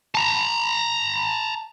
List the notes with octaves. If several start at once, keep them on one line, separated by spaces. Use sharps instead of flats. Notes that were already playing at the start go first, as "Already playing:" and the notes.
A5 A#5